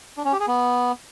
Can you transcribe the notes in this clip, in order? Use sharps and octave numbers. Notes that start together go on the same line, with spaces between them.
D4
C#4
G4
G#4
B3